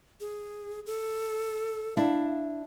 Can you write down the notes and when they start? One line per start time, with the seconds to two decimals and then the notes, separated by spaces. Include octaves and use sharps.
0.20 G#4
0.86 A4
1.97 D4 E4 F5